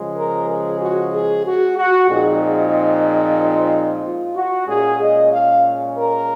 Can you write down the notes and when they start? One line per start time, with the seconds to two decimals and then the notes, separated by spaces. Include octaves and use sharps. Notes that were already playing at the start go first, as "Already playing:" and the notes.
Already playing: C#3 F3 G#3
0.16 A#4
0.49 G#4
0.81 F#4
1.13 G#4
1.45 F#4
1.77 F#4
2.09 A#2 F3 G#3 C4 D#4 G#4
4.03 F4
4.36 F#4
4.68 A#2 G#3 C#4 G#4
5.01 D#5
5.32 F5
5.97 A#4